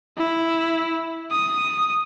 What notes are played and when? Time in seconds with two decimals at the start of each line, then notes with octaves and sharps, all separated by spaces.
0.17 E4
1.31 D#6